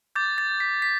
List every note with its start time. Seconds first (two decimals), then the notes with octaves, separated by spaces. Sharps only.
0.16 D6 G6 A6
0.38 A6
0.60 B6
0.82 B6